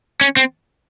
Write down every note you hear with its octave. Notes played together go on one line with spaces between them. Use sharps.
C#4
C4